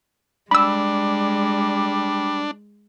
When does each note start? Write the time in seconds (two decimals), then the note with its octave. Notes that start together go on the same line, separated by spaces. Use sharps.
0.51 G3 G#3 D4 B5 E6